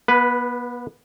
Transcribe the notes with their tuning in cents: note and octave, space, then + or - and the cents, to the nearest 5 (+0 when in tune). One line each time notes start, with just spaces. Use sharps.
B3 -35 B4 +0